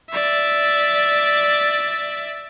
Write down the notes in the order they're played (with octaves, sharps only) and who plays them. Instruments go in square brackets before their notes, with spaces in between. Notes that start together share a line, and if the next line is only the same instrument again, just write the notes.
[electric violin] D5 E5